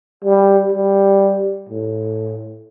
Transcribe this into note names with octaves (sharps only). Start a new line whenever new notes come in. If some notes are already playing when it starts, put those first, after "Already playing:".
G3
G3
A2